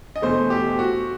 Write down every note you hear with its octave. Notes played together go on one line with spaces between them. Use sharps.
D#5
E2 B2 A3 C5
G4
F#4